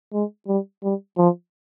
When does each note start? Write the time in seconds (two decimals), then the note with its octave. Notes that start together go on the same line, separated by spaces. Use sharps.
0.13 G#3
0.47 G3
0.83 G3
1.18 F3